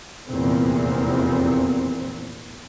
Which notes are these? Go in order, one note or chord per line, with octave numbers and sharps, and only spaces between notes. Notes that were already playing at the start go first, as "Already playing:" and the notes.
F1 E2 A#2 C4